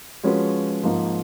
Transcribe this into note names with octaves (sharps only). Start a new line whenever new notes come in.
F3 G#3 C#4 F#4 B4
G#2 F3 A#3 D#4